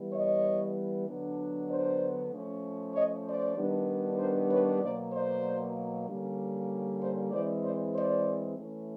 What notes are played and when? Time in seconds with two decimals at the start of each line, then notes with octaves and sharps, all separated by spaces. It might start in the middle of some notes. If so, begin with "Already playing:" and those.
Already playing: E3 G3 B3
0.13 C#5 D#5
1.07 D3 F#3 B3 D4
1.69 C5 D5
2.31 F3 A3 C#4
2.95 C#5 D#5
3.26 C5 D5
3.58 D#3 G3 B3 D4
4.19 A#4 C5
4.50 B4 C#5
4.81 B2 F#3 A#3 C5 D5
5.13 C5 D5
6.07 D3 G3 A#3 C#4
7.01 C5 D5
7.32 E3 G#3 C4 C5 D5
7.63 C5 D5
7.94 C5 D5
8.57 E3 A3 C#4